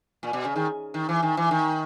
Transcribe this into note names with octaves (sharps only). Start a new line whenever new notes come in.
A#2
B2
C#3
D#3
D#3
E3
D#3
E3
D#3